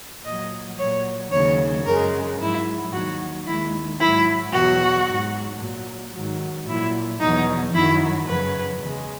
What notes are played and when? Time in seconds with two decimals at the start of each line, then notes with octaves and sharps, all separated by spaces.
0.24 A#2 F#3 D#5
0.78 A#2 F#3 C#5
1.31 D#2 C#3 F#3 C#5
1.85 F#2 C#3 G#3 A#4
2.39 G#2 F#3 E4
2.92 D#2 D#3 F#3 F#4
3.45 D#2 D#3 G#3 E4
3.99 G#2 F#3 E4
4.52 E2 B2 F#3 F#4
5.06 G#2 F#3
5.59 A#2 F#3
6.12 G#2 D#3 F#3
6.66 A#2 F#3 E4
7.19 E2 B2 F#3 D#4
7.73 F#2 D#3 F#3 E4
8.27 F#2 C#3 F#3 B4
8.81 E2 C#3 G#3